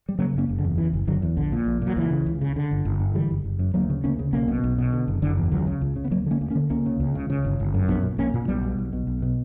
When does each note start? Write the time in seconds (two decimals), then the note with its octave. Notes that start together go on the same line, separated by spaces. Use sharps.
0.09 G3
0.19 C#3 F#3 A#3
0.34 F#1 A#3 C#4
0.49 F#1
0.59 D3
0.64 E2
0.78 C#3 E3
0.93 F#1
1.07 F#1 D3 F#3
1.22 E2
1.37 A#1 D3
1.52 A#2
1.66 A#1
1.82 A#2
1.87 F#3
1.96 C#2 E3
2.11 C#3
2.26 C#2
2.41 C#3
2.56 D3
2.71 G1
2.85 G1
3.00 G2
3.15 D3 E3 G3
3.30 F#1
3.44 F#1
3.59 F#2
3.74 D2 F#3 A#3
3.90 C#3
4.04 D2 A#3 C#4
4.19 C#3
4.33 B1 A#3 C#4
4.48 B2
4.64 B1
4.78 B2
4.93 D3
5.08 F#1
5.22 F#1 D3
5.37 E2
5.51 C#2 D3 F#3
5.67 C#3
5.81 C#2
5.96 C#3
6.05 B3
6.11 D2 F#3 A#3
6.26 D3 A#3 C#4
6.41 D2
6.50 A#3 C#4
6.55 D3
6.70 C#2 A#3 C#4
6.86 C#3
7.00 C#2
7.15 C#3
7.30 C#3
7.45 G1
7.60 G1
7.74 F#2
7.88 A#1 B3 D4
8.03 A#2
8.18 A#1 A#3 C#4
8.34 A#2
8.48 B1 G3 B3
8.63 B2
8.78 B1
8.93 B2
9.07 B1
9.22 B2